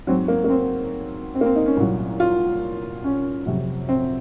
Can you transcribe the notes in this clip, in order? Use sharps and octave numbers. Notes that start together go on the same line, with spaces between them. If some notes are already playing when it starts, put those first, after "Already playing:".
G#2 F#3 C4
A#3
A#3
C4
C4
A#3
C4
D#4
C#4
C2 A#2 F#3
F4
C#4
F2 C3 F#3
C4